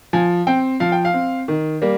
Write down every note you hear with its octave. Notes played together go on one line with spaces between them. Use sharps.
F3 G#5
C4 G5
F3 F5
G5
F5
C4
D#3
G3 A#3